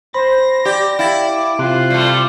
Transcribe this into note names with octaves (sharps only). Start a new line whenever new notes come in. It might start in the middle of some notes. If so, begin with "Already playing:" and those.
C5 B5 A#6
G4 D5
E4 F5 G5 A6
D6
C3 F4 C5 F#6
G3 A3